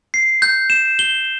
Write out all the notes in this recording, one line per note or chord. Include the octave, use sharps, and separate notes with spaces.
C7
G6
E7
G7